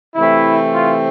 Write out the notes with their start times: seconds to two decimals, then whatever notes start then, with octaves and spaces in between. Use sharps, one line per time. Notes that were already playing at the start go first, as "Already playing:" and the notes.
0.15 C3 E3 A3 C4 E4
0.74 F4